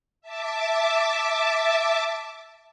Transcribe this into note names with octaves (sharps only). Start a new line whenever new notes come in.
E5 A5 D6